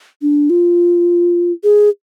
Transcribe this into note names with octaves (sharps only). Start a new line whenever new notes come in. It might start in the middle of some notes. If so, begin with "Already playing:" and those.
D4
F4
G#4